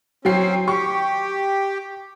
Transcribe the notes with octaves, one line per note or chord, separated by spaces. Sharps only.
F#3 C4 C#4 G5 C7
G4 C#6